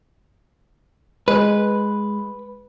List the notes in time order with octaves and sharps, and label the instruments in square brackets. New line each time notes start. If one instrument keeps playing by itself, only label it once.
[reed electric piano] G#3 [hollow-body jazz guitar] B4